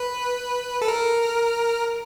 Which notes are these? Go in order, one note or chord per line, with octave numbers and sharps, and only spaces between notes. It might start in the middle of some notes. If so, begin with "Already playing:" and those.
Already playing: B4
A4
A#4